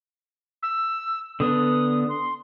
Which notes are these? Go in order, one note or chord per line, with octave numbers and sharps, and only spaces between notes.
E6
D3 B3 D4 D#6
C6